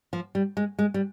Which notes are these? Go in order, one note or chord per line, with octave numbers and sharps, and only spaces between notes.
F3
G3
G#3
G#3
G3